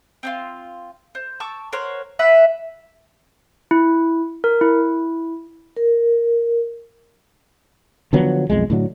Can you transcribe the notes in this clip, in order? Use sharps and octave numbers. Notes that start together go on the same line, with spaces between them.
C4 D4 F4
C5
A5 C#6 D6 E6
A#4 C5 C#5 F#5
B4 E5 F#5
E4
A#4
E4
A#4
D3 F3 F#3 B3
B1 F2 G#3
A2 D3 F#3